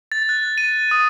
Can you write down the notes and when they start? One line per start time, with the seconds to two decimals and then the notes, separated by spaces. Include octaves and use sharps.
0.12 A6
0.29 F#6
0.58 D#7
0.91 D#6